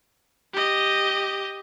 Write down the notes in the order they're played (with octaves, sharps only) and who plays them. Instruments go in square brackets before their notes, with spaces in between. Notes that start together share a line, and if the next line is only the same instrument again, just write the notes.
[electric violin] G4 D#5